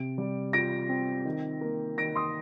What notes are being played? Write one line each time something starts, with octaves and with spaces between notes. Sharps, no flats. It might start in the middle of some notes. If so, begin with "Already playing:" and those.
Already playing: C3 D7
G3
F4 A#6 D7
C4
D#3
A#3
D#3 A#6 D7
C6 D#6